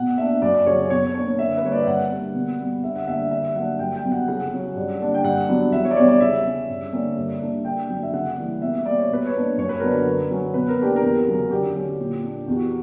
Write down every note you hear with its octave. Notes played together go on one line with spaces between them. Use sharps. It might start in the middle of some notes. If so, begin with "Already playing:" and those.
Already playing: B2 F#5
A#3 D4 E5
F#2 D5
D5
C#3 F#3 C#4 C#5
B2 C#5
A#3 D4 C#5
D3 E5
B4
G3 A#3 C#5
D5
E5
G2 F#5
D3 A#3
B2
G3 B3
D3 E5
F#5
G3 A#3 D4 E5
D3 E5
F#3 A#3 D4 F#5
G2 G5
G5
F#3 B3
F#5
C#3 F#5
F#3 C#4
G2
D3 A#3 D4
G5
G2 F#5
F#3 B3 D4
E2 E5
C#5
D5
B2 G3 B3 D4 C#5
D5
C#3 E5
G3 C#4
G2
D3 G3 A#3 C#4
G2
D3 A#3 D4
D3 G5
F#3 A#3 D4 G5
E5
C#3 F#5
E3 G3 A#3
B2 E5
G3 A#3 D5
C#5
B2 B4
C#5
A#3 D4
F#2 C#5
B4
D3 F#3 B3 D4 A#4
B4
D3
F#3 C#4
B2 B4
A#4
A#3 D4 G4
A#4
E2
C#3 F#3
D3 G4
F#3 C#4
A#2
A#3 D4
E2 G4
F#4